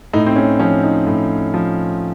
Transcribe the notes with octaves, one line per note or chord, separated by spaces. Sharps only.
A2 D#4
C4
C#4
F3 C#4
D#4
A2
F3